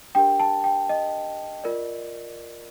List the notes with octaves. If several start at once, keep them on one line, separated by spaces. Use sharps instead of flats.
D4 G4 A#4 G5
A5
G5
D#5
F4 A#4 D5